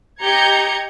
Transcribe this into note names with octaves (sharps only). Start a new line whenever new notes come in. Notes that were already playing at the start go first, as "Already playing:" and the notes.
G4 D#5 A#5 G6 G#6 C#7